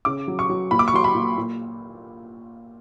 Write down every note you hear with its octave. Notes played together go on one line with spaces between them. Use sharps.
C#3 D6
F#3
C#6
F#3
A#2 B5
D6
C#6
F#3 C6
B5
A#2
A#2